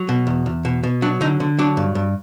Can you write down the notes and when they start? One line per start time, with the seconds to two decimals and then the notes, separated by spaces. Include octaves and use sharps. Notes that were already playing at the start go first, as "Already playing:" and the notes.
Already playing: F#3
0.09 B2
0.27 E2
0.46 E2
0.65 B2
0.83 B2
1.02 F#3 D4
1.21 D3 D#4
1.40 D3
1.59 F#3 D4
1.77 G2
1.95 G2